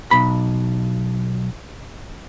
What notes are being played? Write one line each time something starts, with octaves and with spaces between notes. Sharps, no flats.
B1 B5